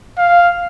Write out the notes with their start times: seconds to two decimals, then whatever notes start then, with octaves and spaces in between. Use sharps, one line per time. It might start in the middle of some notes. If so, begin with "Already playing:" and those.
0.18 F5